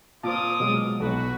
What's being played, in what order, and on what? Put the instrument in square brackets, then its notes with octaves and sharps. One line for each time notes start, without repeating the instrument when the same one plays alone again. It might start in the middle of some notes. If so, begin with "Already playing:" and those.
[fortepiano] A#2 [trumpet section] F4 D6 D#6 [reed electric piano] C5 A5
[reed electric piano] B2 F#3 G#3
[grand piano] B1 [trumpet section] F#4 B4